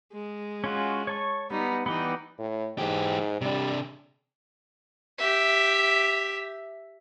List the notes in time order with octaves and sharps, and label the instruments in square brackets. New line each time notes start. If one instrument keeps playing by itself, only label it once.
[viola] G#3
[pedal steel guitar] C#4 F4 F#4
C#5 A5 C#6
[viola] G3 D#4 [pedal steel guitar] B3
[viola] E3 D#4 [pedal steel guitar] B3 G4 D5
[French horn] A2
[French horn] G#2 [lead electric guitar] E3 G4
[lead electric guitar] C3 D4 [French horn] G3
[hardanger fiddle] G4 E5